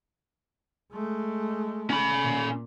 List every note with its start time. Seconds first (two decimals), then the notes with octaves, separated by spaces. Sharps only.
0.93 G#3 A3
1.90 C#4 B5
2.20 A#2